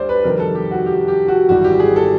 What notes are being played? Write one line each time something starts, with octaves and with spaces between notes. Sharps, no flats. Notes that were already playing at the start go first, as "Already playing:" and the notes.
Already playing: D2 D3 G3 C5 D5
B4
F2 C3 D#3 G3 A#4
A4
G4
F#4
G4
G4
F#4
G#1 G#2 E3 G3 F#4
G4
G#4
A4